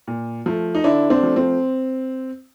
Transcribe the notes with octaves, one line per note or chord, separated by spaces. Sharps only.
A#2
F3 A3
D#4
D3 D4 E4
C4 D4
F3 A3
C4